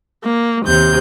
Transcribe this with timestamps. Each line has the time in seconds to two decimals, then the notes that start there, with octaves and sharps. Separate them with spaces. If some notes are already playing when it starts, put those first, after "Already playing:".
0.23 A#3
0.65 D#2 C3 G6